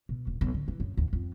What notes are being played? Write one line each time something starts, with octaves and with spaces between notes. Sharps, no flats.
B2
D#1
B1
D3
E3
F#2
D#2
F2